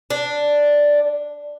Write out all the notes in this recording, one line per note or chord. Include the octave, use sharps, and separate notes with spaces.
D4